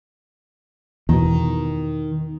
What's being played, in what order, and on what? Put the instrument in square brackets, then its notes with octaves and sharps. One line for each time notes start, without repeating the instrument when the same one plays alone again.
[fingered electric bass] E2 B2 [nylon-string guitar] D#3